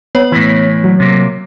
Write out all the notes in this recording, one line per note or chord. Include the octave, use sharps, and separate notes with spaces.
B3 C#5
A2 E3
F#3
C3 A#3